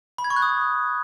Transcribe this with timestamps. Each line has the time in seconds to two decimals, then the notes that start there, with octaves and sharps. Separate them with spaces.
0.18 B5
0.24 G#6
0.30 C#6
0.36 F#6
0.42 D#6